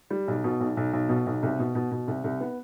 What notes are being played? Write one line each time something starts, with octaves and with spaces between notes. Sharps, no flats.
G3
B1
B2
B1
B1
B1
B2
B1
C2
B2
B2
B2
C2
C2
B3